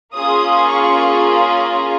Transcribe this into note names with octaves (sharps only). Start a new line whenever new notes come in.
A#3 C#4 F4 G#4 D#6
C#6